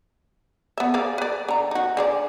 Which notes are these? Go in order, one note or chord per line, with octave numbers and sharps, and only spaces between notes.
B3 E5
G#4 D5 F5
B4 D5
D3 A#5
D#4 F#4
D3 G#4 D5